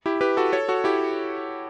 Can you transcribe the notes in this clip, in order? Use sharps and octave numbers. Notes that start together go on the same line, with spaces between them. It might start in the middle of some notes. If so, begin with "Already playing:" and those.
E4 G4
G4 B4
F#4 A4
A4 C#5
F#4 A4
E4 G4